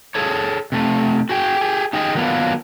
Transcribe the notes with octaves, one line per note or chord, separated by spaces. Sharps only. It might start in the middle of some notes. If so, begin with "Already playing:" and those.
G#4 A4 C#5
C3 A3
F#4 G#4 G5
G4 G#4
D#4 G4 G#4 D#5
D#3 F#3 A#3 B3 D4 F4